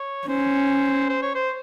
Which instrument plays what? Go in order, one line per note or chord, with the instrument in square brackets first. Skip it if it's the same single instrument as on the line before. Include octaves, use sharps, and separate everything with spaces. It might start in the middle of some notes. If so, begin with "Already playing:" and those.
Already playing: [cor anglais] C#5
[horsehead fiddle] C#4 [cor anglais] C5
[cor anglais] C5
C#5
C5